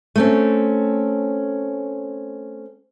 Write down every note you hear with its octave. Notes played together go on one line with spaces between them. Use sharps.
A3 C4 C#4